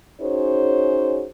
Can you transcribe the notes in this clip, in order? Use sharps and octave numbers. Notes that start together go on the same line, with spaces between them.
C#4 D#4 F#4 G#4 C5 C#5